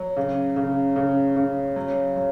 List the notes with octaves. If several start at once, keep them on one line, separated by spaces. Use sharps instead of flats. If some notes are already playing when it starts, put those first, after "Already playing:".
Already playing: F#3
C#3
C#3
C#3
C#3
F#3
F#3